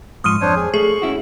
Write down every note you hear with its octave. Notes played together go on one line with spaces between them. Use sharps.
G#2 F3 C6 C#6 D#6 F6 D#7
F2 D4 C5 C#5
G#4
A3 G#4 C#6
C#4 E4 F#4